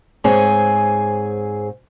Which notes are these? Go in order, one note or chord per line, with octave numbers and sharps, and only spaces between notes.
G#2 C4 G#4 C#5 G#5